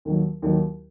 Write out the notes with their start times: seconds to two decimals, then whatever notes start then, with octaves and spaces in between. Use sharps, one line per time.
0.05 D#2 D#3 F#3
0.42 D#2 D#3 F#3